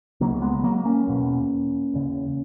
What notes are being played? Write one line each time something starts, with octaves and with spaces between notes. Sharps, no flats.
C#2 C#3 F#3 A#3
G#3 B3
B3
F#3 A#3
A#3 C#4
E2 B2
E2 C#3